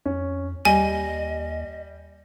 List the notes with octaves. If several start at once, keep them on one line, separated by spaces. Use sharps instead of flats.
F2 C#4
D#2 G3 D#5 G#5